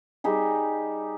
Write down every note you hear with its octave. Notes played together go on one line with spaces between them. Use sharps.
G3 D#4 G4 G#4